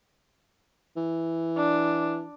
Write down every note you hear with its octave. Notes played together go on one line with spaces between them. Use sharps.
E3
D4